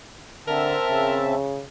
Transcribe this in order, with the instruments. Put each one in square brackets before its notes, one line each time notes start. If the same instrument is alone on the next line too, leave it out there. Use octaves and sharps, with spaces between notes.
[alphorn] D3 [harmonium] C4 E5 A5 [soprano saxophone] A#4
[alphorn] C#3